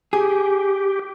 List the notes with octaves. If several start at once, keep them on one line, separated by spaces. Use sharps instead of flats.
G4 G#4